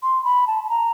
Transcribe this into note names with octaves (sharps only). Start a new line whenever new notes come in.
C6
B5
A5
A5
A#5